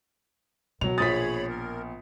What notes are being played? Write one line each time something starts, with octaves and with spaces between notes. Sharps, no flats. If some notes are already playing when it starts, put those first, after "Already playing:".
B2 D#3 F#3 F7
A#1 G#4 C#5 B5 D#6 A6 B6
A#4